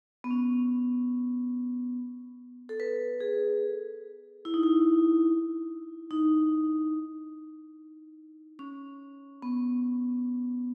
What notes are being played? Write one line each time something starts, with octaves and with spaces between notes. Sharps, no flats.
B3
C#4
A4
B4
G#4
E4
D#4
E4
D#4
C#4
B3